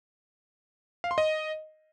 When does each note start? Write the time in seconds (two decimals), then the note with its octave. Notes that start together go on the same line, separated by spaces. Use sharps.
1.04 F5
1.11 C6
1.18 D#5